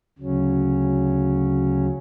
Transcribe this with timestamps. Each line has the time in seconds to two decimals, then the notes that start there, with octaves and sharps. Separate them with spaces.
0.18 D2 C#3 F#3 C#4